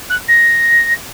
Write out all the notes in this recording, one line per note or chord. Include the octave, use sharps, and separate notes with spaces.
F#6
A#6